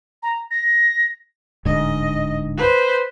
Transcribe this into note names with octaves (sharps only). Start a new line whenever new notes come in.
A#5
A#6
D1 G#2 D3 D#5
B4 C5